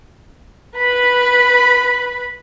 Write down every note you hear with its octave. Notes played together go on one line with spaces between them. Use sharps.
B4 B5